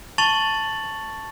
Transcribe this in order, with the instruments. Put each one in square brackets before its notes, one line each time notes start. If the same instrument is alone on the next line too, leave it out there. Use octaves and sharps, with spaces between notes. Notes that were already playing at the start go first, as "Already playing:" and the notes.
[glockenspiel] A5 C#6 A6 F7 F#7